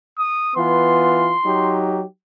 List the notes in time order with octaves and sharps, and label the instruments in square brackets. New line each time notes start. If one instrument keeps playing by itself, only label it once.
[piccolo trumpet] D#6
[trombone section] E3 B3 F4 [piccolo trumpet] C6
[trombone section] F#3 D#4 G4